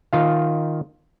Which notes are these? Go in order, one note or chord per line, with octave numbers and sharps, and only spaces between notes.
D#3 F4 F5